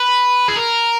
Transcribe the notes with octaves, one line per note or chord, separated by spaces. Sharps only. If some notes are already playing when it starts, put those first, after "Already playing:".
Already playing: B4
G#4
A#4